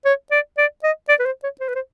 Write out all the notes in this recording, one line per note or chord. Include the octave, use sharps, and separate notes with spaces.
C#5
D5
D5
D#5
D5
B4
C5
C#5
C5
B4
C5